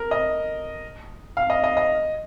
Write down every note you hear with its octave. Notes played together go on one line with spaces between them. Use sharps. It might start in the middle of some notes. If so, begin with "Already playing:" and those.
Already playing: A#4
D#5
F5
D#5
D#5
D#5